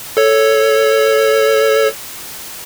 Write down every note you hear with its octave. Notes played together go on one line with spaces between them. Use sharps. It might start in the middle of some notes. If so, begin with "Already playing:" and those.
A4 C#5